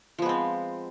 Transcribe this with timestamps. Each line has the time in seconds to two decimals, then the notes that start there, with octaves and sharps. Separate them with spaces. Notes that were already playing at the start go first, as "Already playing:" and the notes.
0.18 F3
0.22 B3
0.26 G#3
0.29 C4